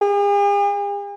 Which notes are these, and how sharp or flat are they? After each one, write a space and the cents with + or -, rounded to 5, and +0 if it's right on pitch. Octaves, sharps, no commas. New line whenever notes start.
G#4 -45